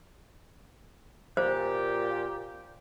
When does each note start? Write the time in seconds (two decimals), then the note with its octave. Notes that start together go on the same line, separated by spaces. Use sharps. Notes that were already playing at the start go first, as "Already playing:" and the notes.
1.37 A#2 G4 C5